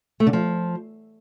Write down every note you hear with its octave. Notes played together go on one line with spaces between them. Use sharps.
A3
D3
F3